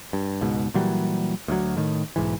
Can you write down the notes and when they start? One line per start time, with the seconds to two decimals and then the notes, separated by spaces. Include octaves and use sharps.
0.13 G2
0.42 C#2 G#2 B2
0.74 A#2 E3 F#3 G3
1.48 D2 F#3
1.77 A2 D#3
2.16 B1 G#2 E3